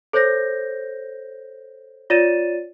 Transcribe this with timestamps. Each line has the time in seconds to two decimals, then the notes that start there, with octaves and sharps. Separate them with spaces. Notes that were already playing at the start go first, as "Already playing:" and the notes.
0.13 A4 C5 C#5 G6 A#6
2.10 F4 C#5 D5 A6 D#7 E7